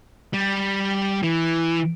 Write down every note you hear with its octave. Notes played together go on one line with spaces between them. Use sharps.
G3
E3